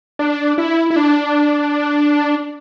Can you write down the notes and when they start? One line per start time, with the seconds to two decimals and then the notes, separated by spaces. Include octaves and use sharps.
0.19 D4
0.58 E4
0.90 E4
0.96 D4